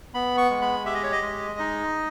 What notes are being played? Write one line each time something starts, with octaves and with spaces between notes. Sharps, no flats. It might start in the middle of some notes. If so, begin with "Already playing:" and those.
B3 B5
C#6
G#3
B5
G4 E5
D#5
C#5
D#5
G#3
D#4